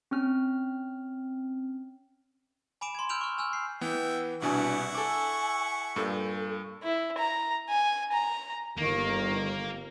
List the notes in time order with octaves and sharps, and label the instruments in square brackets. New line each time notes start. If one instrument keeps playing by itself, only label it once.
[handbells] C4 C#4 F6
[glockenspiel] G#5 B5 D6 D7 E7
C6 G#6
E6 F6 G6 D7 F7 F#7
C#6 F6
G#5 E6 F6 G6
C7
[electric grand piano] E3 B3 [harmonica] E5 G5
[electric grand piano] C2 B2 G#5 [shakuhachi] D4 [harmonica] E4 F#5 C#6
[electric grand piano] A4 D6 [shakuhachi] G#5
[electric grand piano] G2 A#2 [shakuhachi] A4
[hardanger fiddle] E4
A#5
G#5
A#5
[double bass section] G1 [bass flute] D#3 [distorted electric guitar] A#3